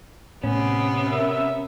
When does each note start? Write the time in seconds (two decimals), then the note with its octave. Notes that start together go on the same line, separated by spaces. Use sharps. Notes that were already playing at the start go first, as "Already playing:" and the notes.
0.43 A2 C3 B3 C#4
1.10 A#4 E5